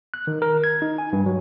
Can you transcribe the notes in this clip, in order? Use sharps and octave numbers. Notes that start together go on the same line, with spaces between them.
F#6
D#3
A#4
G#6
D#4
G#5
G2
F#3